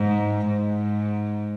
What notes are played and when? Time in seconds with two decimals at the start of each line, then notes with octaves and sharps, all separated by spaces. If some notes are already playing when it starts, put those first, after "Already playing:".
Already playing: G#2
0.47 G#2